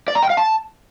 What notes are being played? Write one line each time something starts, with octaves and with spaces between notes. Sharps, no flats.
D5
A#5
G5
F5
A5